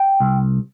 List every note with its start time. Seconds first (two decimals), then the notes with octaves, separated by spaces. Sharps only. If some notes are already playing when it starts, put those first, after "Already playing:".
Already playing: G5
0.20 C2